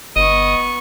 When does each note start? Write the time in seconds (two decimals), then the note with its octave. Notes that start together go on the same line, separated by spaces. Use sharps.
0.16 G1 B3 D#5 C#6